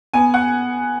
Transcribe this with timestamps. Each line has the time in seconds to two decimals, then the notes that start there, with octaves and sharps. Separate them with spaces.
0.14 B3 G#5
0.34 F#5